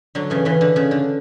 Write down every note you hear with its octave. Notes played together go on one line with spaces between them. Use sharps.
D3 F#3
C#3 E3
C#3 E3
D3
C#3
D3